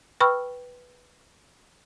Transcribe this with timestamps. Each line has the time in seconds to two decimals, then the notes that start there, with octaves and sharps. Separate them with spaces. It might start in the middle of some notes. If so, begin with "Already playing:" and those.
0.20 B4 G5 B5 C#6 E6 F6